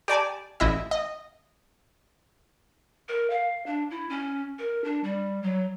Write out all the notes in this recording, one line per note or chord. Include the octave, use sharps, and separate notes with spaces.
G4 D5 G#5 A5
A1 E4 D#5 E5
D#5
A#4
F5
D4
E4
C#4
A#4
D4
G3
F#3